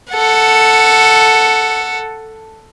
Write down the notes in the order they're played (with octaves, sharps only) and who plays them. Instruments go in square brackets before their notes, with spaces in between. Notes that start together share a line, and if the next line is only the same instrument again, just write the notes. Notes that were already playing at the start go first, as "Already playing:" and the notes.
[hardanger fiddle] A4 F#5